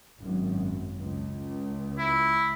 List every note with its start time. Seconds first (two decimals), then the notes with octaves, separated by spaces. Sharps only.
0.17 G#1 F#2
1.01 C#2
1.98 E4